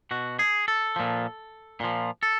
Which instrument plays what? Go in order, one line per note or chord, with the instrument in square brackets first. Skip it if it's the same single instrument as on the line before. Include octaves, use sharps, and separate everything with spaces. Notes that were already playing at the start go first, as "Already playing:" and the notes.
[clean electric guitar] B2 F#4
G#4
A4
A#2 F3
A#2 F3
A4